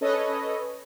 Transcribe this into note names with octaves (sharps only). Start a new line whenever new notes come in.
C#4 A4 B4 C#5 D#5